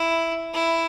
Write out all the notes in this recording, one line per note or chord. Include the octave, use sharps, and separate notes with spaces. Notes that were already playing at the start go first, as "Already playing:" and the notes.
Already playing: E4
E4